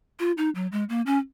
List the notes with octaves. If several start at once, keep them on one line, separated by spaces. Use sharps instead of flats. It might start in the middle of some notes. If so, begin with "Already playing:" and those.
F4
D#4
F#3
G#3
A#3
C#4